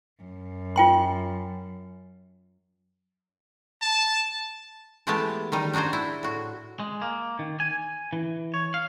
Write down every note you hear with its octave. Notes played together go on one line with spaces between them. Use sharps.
F#2
F4 G5 C6
A5
E3 G#3 A3 B3 G4 A5
D#3 G3 D#4
D4 D#4 F#4 G#4 C5
E4
A2 F#4
G#3
A#3
D#3
G#5
E3
C#5
F5